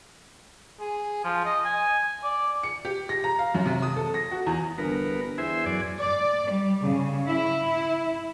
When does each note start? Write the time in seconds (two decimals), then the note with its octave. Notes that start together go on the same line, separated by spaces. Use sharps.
0.80 G#4
1.24 F3
1.45 D#5
1.65 G#5
2.24 D5
2.63 C#7
2.85 G4
3.09 A#6
3.24 A#5
3.39 F5
3.54 F#2
3.66 C3
3.82 D#6
3.96 A4
4.14 A#6
4.31 F#4
4.46 E2
4.78 G1 B3 A#4
5.38 E2 C5 E5 G#5
5.66 F#2 D5 G#5
5.99 D5
6.50 G3
6.82 C#3
7.27 E4